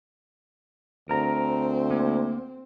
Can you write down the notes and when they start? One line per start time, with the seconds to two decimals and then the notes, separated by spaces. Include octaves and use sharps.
1.09 D2 C4 A#4 A#5
1.90 A#3